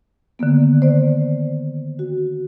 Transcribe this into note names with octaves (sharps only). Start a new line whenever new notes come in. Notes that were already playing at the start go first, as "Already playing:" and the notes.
D3 D#3 A#3 B3
C5 D5
F#4